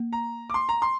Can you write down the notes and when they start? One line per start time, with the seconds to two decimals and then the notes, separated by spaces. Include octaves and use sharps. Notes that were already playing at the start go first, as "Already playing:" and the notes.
Already playing: A#3
0.13 A#5
0.50 D6
0.54 C6
0.69 A#5
0.82 C6